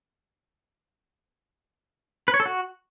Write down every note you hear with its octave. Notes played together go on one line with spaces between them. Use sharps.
B4
C#5
A4
F#4